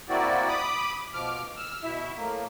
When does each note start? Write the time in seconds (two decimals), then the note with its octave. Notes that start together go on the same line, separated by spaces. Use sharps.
0.09 A#3 C4 E4 F#4 D5
0.48 B5 D6 D#6
1.14 B2 F3 D6 F6
1.57 E6 F6
1.83 B2 E4 E5
2.16 A2 A#3